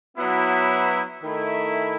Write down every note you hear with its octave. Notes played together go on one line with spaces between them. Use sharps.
F#3 B3 E4
D#3 A3 E4